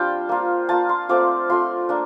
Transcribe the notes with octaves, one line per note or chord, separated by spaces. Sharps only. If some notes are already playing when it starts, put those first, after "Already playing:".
Already playing: G3 C4 D4 F4 G5 A5
A#3 F4
A#3 F4 A5
C6
A3 C4 F4 D6
A3 C4 F4 C6
A#3 D4